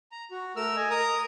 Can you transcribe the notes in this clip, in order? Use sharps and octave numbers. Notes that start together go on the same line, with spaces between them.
A#5
F#4
A3 A#4 E6 F6
D#5 G#5
A#4 A#5 D#6